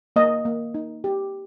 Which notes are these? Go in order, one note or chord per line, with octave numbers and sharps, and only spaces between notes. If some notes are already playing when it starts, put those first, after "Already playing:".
A#3 D#5
A#3
D#4
G4